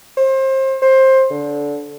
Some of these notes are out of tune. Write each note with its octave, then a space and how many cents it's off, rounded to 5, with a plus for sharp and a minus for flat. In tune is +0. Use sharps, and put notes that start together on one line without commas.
C5 +30
C5 +15
D3 -20